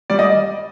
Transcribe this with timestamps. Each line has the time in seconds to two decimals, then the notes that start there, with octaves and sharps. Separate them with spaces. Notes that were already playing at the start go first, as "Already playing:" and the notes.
0.10 G3 D5
0.19 D#5